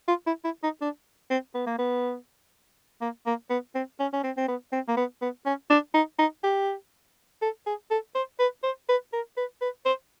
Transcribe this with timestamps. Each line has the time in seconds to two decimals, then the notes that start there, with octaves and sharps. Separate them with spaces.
0.08 F4
0.27 E4
0.44 E4
0.63 D#4
0.81 D4
1.30 C4
1.54 B3
1.66 A#3
1.78 B3
3.01 A#3
3.26 A#3
3.50 B3
3.75 C4
3.99 C#4
4.13 C#4
4.24 C4
4.37 C4
4.48 B3
4.72 C4
4.88 A#3
4.97 B3
5.22 B3
5.46 C#4
5.70 D4
5.94 D#4
6.19 D#4
6.43 G4
7.42 A4
7.66 G#4
7.90 A4
8.15 C5
8.39 B4
8.63 C5
8.89 B4
9.13 A#4
9.37 B4
9.61 B4
9.85 C5